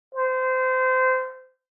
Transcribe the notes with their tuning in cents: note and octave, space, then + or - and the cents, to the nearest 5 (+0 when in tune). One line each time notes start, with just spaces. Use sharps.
C5 -25